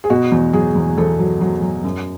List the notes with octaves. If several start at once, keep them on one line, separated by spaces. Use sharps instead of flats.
G#4
B2 F#4
E2
F#3 G#4
E2
E2 A4
F#3
F#3
F#3
F#2